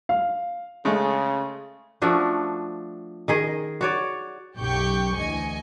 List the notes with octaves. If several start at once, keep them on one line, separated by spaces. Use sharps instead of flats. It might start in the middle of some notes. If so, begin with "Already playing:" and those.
F5
C#3 G#3 A3
F3 A3 D4 F#4
D#3 G#4 D#5
F#4 C#5 D5
B1 F#2 G4 G5 C#6 G6
D2 E3 D#5 G#5 C#7